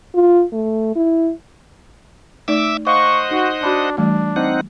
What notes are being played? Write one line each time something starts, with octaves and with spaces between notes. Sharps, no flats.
F4
A3
E4
A3 D#4 D5 E5 D6 E6
C5 D#5 F5 F#5 C#6
D#4 F#4
D4 F#4 B5 C6
E3 G3 A3 D4
C4 D#4 F#5